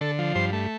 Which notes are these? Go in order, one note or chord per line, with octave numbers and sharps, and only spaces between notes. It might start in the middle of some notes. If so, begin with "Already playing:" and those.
D3 A4
F3
G2 C5
A3